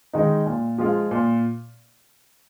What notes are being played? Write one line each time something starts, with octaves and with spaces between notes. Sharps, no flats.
D#3 G#3 D#4
A#2
F3 G#3 F4
A#2